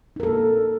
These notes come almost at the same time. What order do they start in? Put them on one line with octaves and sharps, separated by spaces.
D#4 A#4 A4 A#3